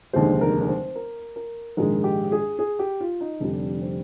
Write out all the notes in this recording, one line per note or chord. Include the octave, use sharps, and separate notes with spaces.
F1 D#2 D3 G#3 C5
A#4
A#4
C5
A#4
A#4
A#1 G#2 D#3 G#3 A#4
G4
G#4
G#4
G4
F4
D#4
F1 F2 D3 G3 D4
C4